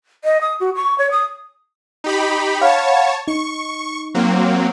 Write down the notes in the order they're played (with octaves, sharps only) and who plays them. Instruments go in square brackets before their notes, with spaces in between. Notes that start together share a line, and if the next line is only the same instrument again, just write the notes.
[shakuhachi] D#5
D#6
F#4
C#6
C#5
D#6
[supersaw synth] D#4 G4 B5
[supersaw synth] C#5 A5 [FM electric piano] F5 F#5 B5
[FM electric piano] D#4 [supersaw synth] C#6
[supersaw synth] F#3 A#3 C4